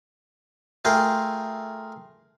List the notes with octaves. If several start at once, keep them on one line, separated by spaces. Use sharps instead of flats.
A3 F4 G#4 A#4 G5